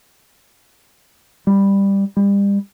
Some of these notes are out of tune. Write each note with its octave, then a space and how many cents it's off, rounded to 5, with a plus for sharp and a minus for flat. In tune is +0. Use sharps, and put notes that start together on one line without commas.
G3 +10
G3 +35